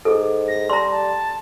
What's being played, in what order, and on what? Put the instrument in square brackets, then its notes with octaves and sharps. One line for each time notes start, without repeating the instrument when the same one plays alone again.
[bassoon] G#2 [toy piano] G#4 A4
[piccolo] A#6
[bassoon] G3 [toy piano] A#5 C6
[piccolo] A5